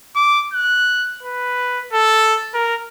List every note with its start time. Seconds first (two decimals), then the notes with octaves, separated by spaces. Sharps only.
0.16 D6
0.53 F#6
1.23 B4
1.93 A4
2.54 A#4